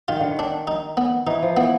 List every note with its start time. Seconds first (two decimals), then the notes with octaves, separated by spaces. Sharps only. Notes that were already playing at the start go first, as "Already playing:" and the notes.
0.08 D#3 F4
0.21 D3
0.31 D#3
0.39 D4
0.67 D#4
0.97 B3
1.26 E3 D#4
1.42 F3
1.56 E3 B3